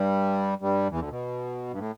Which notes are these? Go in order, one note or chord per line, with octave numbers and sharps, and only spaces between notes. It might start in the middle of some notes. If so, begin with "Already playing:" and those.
Already playing: G2 G3
G2 G3
E2 E3
D2 D3
B2
G2
A2